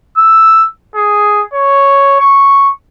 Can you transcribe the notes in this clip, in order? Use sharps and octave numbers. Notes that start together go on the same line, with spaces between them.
E6
G#4
C#5
C#6